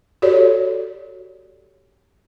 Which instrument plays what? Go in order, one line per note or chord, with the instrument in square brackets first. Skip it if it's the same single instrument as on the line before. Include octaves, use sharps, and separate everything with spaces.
[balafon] F#4 G4 A4 C#5 D5